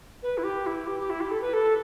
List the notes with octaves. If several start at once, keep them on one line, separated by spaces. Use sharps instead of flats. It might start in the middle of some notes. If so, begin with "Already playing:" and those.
B4
E4
G4
E4
G4
G4
E4
G4
A4
B4
A4